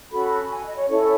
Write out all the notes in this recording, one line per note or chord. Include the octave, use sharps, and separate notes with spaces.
C#4 F#4 A4 B5
G#5
D#5
C#5
C#4 E4 A4 C#5
C#5